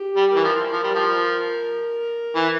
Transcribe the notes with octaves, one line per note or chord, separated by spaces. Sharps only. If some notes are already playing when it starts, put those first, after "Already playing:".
Already playing: G4
G3
E3 A#4
F3
F3 A#4
G3
F3
E3